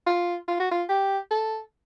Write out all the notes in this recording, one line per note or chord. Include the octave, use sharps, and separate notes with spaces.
F4
F4
F#4
F4
G4
A4